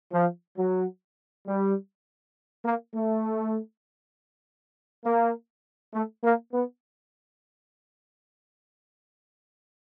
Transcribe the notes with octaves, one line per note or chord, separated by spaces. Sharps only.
F3
F#3
G3
A#3
A3
A#3
A3
A#3
B3